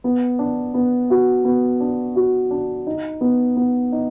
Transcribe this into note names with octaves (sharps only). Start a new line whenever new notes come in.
B3
D4
B3
F#4
B3
D4
F#4
D4
D#4
B3
B3
D#4